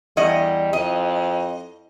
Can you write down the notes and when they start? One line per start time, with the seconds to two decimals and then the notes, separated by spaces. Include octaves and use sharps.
0.17 E2 G3 D#5 F#5
0.73 F2 D#5